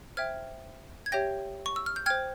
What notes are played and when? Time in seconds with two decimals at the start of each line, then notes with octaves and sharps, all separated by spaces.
0.17 C5 E5 G5 F6 G#6
1.06 G#6
1.12 G4 C#5 E5 G5 G6 A#6
1.66 C#6
1.76 E6
1.86 F6
1.96 G6
2.06 C5 G5 F6 G#6